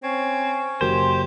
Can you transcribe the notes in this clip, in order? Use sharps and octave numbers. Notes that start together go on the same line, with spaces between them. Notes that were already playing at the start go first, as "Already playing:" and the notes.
C4 C#4 C#5
F#1 F#4 G4 A#4 C5